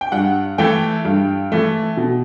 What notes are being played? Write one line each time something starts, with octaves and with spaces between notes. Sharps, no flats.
G5
G2 F#5
E3 A3 G5
G2
E3 A3
B2